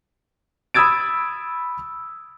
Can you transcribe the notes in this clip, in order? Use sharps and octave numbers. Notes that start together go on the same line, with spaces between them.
B5 D#6 E6 G#6 A6 D7